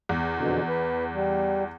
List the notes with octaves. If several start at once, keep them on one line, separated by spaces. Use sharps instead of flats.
E2
F2 B2 D3
B4
G3